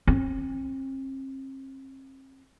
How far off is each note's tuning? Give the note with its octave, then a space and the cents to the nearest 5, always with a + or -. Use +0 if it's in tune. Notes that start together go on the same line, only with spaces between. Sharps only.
C4 +40